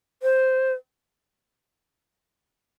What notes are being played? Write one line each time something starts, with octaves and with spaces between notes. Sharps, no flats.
C5